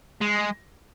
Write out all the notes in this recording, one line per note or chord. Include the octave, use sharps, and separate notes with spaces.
G#3